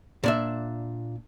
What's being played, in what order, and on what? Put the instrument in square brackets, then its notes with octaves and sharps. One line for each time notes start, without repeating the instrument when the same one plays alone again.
[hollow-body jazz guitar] A#2 D4 E5